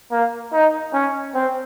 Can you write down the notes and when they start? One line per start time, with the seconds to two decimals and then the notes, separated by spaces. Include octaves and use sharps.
0.11 A#3
0.53 D#4
0.93 C#4
1.34 C4